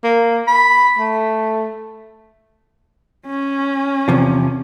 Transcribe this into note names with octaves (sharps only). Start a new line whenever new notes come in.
A#3
B5
A3
C#4
E2 C3 F3